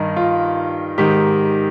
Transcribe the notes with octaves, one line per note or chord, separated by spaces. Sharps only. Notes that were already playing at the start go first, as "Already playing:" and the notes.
Already playing: G2 D#3 D#4
F4
G#2 D#3 G4